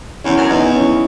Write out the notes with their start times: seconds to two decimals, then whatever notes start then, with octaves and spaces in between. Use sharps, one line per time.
0.24 E2 C#4 E4
0.38 F#2
0.49 E2 B3 D#4
0.73 C#4 E4